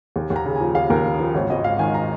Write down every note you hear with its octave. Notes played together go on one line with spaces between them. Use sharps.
D#2
D#2
A#5
C#3
F3 G#5
D#2 F5
D#2 A#4
C#3 G#4
F3 A#4
G#1 C#5
G#1 D#5
G#2 F5
D#3 G#5
A#5